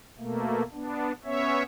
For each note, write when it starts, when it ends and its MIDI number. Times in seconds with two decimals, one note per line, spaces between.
0.19 0.63 47
0.19 0.63 57
0.19 0.63 58
0.74 1.12 59
0.74 1.12 62
1.25 1.63 59
1.25 1.63 61
1.25 1.63 73
1.25 1.63 76